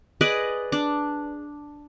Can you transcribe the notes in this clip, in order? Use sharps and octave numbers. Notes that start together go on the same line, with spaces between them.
G#4 B4 D5 D#5
D4